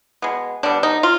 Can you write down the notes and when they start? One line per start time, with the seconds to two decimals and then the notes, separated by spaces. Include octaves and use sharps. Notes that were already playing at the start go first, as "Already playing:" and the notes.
0.22 B2 G#3 B3
0.63 D3 G3 B3 D4
0.83 D#4
1.03 F4